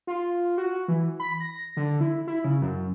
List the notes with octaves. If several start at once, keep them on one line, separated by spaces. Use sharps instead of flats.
F4
F#4
E3
B5
A#6
D3
E4
E4
C#3
F#2